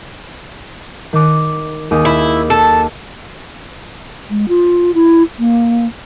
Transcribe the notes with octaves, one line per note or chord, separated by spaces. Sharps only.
D#3 D6
D#2 G#4 D#6
E4
A4
G#3
F4
E4
A#3